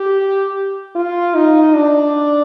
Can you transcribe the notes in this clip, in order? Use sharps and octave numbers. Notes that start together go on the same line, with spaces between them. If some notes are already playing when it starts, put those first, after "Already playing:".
Already playing: G4
F4
D#4
D4